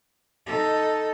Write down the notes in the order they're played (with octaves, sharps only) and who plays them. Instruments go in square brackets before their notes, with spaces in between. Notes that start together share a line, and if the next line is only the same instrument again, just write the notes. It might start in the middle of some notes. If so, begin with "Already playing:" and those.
[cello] D#4 A4